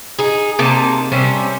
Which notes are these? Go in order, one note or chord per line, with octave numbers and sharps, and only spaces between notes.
D#4 G#4
C3 A#3 D#4 A5
C3 G3 C#4